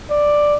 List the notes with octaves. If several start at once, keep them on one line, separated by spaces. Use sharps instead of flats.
D5